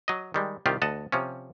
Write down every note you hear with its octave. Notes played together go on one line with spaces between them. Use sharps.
F#3 D#5
D#3 G3 G#3
C2 D#3 F4 G4
D2 D#5 F#5 A5
C3 F3 C#4